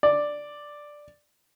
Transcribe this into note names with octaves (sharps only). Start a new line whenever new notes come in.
D5